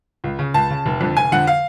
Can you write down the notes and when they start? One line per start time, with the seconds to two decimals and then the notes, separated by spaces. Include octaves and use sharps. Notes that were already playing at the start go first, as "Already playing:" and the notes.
0.24 C#2
0.39 C#3
0.54 C#2 A5
0.70 C#3
0.86 F1
1.01 F2 D3
1.17 F1 G#5
1.32 F2 D3 F#5
1.47 F5